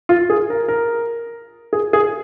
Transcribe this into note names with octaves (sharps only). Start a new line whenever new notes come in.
F4
G#4
A#4
A#4
G#4
G#4